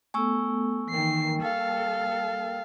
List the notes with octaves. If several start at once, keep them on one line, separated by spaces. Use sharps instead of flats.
A3 B3 A4 G#5 C#6 E6
D#3 E3 A#3 A#4 G5 C7
G3 A4 F5